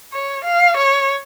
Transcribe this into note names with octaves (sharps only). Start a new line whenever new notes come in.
C#5
F5
C#5